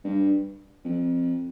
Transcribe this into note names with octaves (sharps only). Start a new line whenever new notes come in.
G2
F2